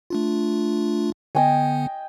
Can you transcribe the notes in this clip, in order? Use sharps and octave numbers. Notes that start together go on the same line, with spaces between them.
A3 D4 F4
D3 B3 D#5 G5 G#5